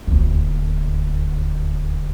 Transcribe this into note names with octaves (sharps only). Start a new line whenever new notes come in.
D#1 D2